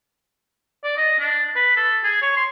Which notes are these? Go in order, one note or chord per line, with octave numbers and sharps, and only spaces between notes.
D5
D#5
D4
B4
A4
G#4
C#5
C6